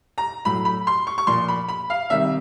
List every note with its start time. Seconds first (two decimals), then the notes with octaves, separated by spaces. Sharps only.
0.18 A#5
0.45 A2 F#3 B5
0.65 B5
0.87 C6
1.07 C#6
1.18 C#6
1.27 A#2 F3 C6
1.48 B5
1.69 B5
1.90 F5
2.10 C3 D#3 G3 E5